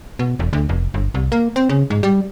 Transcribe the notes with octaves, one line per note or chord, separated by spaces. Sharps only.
B2
E1
D2
F1
G1
C2
A#3
C4
C#3
G#2
G3